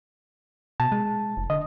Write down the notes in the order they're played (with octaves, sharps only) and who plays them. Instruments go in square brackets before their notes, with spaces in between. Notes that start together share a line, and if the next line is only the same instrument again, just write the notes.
[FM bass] B2 [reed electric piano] A5
[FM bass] G#3
F1
[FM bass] D3 [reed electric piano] D#5